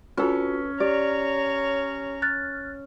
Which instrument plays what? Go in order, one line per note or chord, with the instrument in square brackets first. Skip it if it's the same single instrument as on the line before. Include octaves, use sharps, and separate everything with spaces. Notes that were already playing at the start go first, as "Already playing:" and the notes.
[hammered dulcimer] C#4 [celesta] F4 F#4 [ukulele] A4 B4
[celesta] G4 [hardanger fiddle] C#5 A#5 [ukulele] D5
[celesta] F6 F#6 A6